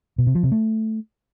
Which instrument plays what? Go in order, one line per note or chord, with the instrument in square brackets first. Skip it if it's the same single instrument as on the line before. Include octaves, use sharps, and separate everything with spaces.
[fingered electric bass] B2
C3
F3
C3
A3